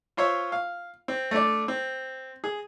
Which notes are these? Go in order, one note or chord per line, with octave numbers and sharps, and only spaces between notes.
F4 C5 C#5 E5
F5
C4
A3 D4 D5
C4
G#4